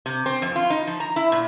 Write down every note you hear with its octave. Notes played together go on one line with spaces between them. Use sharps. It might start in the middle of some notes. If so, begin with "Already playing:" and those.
C3
C4
F2
F4
D#4
F3
A#5
E4
A#2